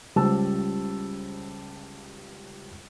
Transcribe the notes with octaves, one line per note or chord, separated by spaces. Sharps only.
C#2 C#3 G3 C5 A5 E6